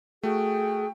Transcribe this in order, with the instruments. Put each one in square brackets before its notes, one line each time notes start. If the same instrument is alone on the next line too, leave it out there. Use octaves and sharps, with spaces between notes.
[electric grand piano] A3 F#4 [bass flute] G#4 [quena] G5